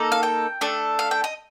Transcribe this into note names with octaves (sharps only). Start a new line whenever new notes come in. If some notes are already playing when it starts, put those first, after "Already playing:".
Already playing: A#3 D#4 A4
F5
G5
A3 D4 A4
F5
G5
D#5